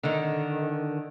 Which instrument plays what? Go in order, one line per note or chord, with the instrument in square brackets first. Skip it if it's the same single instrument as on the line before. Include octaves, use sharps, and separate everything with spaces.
[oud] D3 D#3